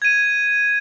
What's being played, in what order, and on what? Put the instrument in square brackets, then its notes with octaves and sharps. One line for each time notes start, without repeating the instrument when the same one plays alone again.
[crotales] G#6 D#7